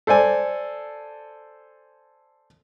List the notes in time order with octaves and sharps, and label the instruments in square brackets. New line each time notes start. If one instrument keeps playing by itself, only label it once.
[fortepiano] A4 C5 D5 G#5